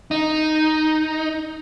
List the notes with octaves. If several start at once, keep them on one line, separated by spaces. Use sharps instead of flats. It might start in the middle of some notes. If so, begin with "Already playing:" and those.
D#4